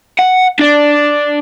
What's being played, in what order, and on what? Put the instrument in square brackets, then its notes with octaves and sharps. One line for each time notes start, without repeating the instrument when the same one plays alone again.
[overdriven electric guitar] F#5
D4 D5